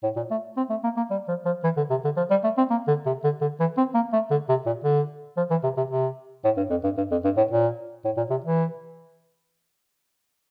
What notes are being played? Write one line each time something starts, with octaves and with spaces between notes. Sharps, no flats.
A2
A#2
A3
C4
A3
A#3
A#3
G3
F3
F3
E3
D3
C3
D3
F3
G3
A3
C4
A#3
D3
C3
D3
D3
E3
C4
A#3
A3
D3
C3
A#2
D3
F3
E3
C3
C3
C3
A2
G2
F2
G2
G2
F2
G2
A2
A#2
A2
A#2
C3
E3